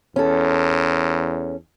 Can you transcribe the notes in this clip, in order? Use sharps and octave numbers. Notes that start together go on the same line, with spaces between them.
E2 C#4 A4